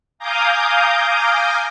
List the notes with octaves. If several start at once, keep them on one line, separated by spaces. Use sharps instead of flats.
F5 G#5 A#5 D6 D#6 G6